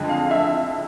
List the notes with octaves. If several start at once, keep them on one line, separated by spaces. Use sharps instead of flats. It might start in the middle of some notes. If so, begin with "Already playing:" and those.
Already playing: F2 D3 G#3
F5
E5